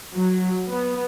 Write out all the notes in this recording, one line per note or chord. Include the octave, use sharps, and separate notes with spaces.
F#3
B3